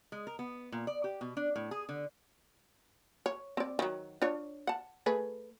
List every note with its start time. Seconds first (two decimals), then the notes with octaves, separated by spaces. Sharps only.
0.12 G#3
0.27 A#4
0.39 B3
0.72 A#2
0.87 D5
1.04 G4
1.21 B2
1.37 D4
1.56 A2
1.71 G#4
1.89 D3
3.26 C#5
3.57 C4 D5
3.79 D#3 F#3
4.22 D4 F4 C#5
4.67 F#5 A5
5.06 A3 G#4 B4